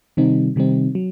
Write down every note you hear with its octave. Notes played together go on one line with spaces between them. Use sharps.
C3 D#3 G3 C4 D#4
C3 D#3 G3 C4 D#4
F#3